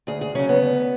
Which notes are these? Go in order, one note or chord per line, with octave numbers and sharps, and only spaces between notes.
D2 G#4
G#4
C#3 F#3 C#4
B3
D2